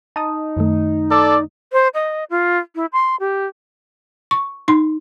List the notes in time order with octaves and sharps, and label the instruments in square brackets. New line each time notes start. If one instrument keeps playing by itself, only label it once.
[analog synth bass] D#4 [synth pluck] A5 D#6
[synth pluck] F#2 D#3 A3
[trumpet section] A4 D5
[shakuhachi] C5
D#5
F4
E4
C6
G4
[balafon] C#6
D#4 C6